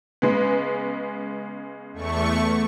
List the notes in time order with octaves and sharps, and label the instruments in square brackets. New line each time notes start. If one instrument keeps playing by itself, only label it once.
[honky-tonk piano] C#3 G#3 B3
[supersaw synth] E2 A3 C#6